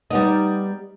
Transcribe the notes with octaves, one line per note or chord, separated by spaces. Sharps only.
G3 B3 D#4